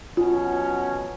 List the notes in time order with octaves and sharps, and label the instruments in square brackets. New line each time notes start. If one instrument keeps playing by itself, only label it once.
[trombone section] B2 F#3 C#4 [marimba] F4